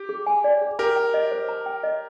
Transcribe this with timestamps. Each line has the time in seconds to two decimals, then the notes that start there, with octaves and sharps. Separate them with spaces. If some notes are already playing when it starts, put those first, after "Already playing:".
Already playing: G4
0.09 G#4
0.26 G#5
0.44 D5
0.61 G#4
0.79 G4 A#4 A#5
0.96 G5
1.14 D#5
1.31 C5
1.49 A#5
1.66 G5
1.83 D#5